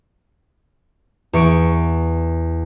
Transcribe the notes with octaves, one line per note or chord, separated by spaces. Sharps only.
E2 C#6 D7